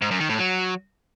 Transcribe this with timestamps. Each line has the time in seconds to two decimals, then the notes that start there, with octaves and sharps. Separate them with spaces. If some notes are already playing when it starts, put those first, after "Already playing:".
0.02 G#2
0.11 F#2
0.20 D#3
0.29 A2
0.39 F#3